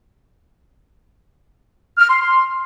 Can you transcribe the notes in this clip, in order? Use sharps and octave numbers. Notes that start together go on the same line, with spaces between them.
F6
C6
C6